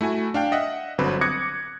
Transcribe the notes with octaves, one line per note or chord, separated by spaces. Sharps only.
A3 E4 F#4 G#5
D4 F5 G5
D#5 E5 F#5
G1 D3 F#3 C4 B4
D6 D#6 F#6 G#6 A#6 C#7